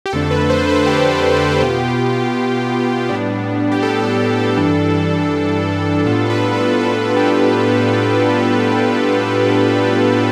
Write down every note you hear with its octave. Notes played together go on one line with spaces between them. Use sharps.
G4
F2 D3 A3 D4 A4
B4
C5
B4
G4
G4
A4
G4
A4
B2 B3 F4 G4
A2 G3 B3 D4
G4
A4
G2 E3 G3 D4
A2 G3 B3 D4 F4 A4
A4
B4
A4
A4
G4